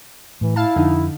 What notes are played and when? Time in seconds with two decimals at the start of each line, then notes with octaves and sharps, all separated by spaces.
0.41 A2 E3
0.56 E4 F5 A5
0.76 F2 D3 D#4